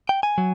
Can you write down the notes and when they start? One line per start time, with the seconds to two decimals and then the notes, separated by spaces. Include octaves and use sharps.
0.09 G5
0.23 G#5
0.38 F#3